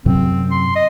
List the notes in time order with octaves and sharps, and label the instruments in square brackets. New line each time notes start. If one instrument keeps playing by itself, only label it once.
[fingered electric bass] F#2 C3 F#3 [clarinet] C4
[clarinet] C6
D#5